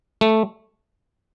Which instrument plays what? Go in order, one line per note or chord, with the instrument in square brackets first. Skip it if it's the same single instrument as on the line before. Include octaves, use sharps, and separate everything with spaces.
[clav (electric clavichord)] A3